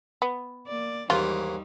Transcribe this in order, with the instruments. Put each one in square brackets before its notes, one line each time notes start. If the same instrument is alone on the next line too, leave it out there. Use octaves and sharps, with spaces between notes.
[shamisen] B3
[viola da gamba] A#3 D5
[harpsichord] D#2 G#2 E3 [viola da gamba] G3 D#4 [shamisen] F4